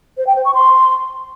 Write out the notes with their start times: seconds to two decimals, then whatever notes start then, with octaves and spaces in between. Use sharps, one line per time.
0.17 C5
0.27 G5
0.36 C5
0.45 C#6
0.54 C6